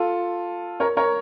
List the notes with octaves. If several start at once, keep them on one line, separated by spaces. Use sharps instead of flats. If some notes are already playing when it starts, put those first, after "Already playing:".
Already playing: F4 A4
A#4 C#5
A#4 C#5